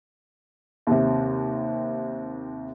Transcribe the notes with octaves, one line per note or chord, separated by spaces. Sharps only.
D#2 C3